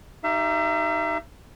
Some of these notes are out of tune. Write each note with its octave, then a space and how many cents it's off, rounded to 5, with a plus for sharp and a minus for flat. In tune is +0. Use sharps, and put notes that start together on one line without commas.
D#4 +0 G4 -30 E5 +40